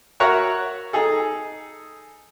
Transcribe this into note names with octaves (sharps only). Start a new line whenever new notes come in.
F#4 A#4 C#5 E5 F#5
D#4 G#4 A4